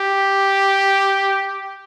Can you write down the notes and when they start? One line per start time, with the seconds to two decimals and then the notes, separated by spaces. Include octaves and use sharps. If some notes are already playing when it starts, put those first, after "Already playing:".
Already playing: G4